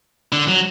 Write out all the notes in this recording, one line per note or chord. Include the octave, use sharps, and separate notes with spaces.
D3
F#3